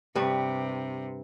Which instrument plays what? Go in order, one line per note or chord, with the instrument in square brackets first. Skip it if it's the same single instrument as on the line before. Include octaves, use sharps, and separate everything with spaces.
[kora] G2 G3 B4 [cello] C3